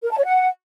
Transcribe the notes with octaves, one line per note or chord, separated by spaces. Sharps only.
A#4
A5
C#5
F#5